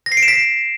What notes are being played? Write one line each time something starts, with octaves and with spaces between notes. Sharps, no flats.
A#6
C7
D7
E7
B6